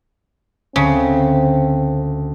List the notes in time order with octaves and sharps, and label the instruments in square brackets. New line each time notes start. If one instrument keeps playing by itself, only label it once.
[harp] D2 [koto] C#3 [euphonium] C4